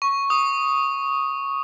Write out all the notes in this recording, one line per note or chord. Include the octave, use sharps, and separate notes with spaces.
C#6
D#6